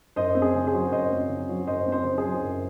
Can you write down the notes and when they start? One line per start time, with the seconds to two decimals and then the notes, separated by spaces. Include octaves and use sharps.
0.16 F#2 C5 D#5
0.35 C4
0.42 G#4
0.55 C#3
0.67 G#4 C5
0.73 F#3
0.92 F#2 C5 D#5
1.11 C4
1.29 C#3
1.49 F#3
1.67 F#2 C5 D#5
1.86 C4
1.92 C5 D#5
2.05 C#3
2.18 G#4 C5
2.24 F#3
2.43 F#2